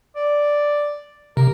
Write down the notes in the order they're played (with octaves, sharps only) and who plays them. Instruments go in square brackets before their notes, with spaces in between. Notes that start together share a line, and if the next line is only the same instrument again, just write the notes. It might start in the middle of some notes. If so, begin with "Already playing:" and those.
[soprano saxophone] D5
[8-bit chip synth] C3 [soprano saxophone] A#4